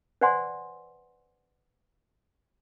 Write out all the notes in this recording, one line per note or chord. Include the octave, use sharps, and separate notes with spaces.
B4 C5 D5 F#5 G#5 C6